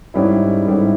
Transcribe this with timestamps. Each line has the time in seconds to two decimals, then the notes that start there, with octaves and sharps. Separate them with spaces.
0.14 G#2 G3 C#4 E4
0.68 G#2 G3 C#4 E4